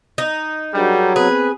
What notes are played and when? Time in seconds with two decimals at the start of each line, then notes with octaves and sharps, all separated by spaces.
0.18 D#4
0.74 F#3 G3 D4 G#4 A#4
1.16 B3 C4 G#4 B4